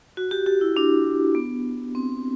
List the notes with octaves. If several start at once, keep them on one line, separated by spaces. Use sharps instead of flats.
F#4
G4
G4
E4
D4
B3
C4